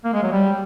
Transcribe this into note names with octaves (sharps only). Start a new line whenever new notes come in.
A#3
G#3
F#3
G3